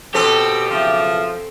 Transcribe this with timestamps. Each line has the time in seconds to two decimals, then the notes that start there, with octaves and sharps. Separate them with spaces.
0.14 B2 C4 G4 A4
0.71 B1 C#3 F3 E5